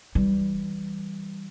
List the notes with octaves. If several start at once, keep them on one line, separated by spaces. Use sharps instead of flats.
E3 G3